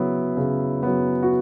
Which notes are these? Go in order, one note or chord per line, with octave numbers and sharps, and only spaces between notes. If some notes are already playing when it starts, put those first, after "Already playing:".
Already playing: C#3 F#3 B3 E4
C#3
F#3 B3
F#4